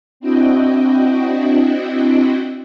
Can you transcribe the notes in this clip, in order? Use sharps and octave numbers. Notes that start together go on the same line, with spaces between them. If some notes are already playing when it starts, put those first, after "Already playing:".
C4 D4 E4 F#4 D#5 G5